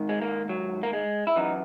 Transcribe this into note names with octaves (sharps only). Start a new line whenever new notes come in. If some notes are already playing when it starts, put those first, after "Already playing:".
Already playing: G#2 D#3
G#3
A#3
F#3
A#3
G#3
E4
F#2 E3 D#4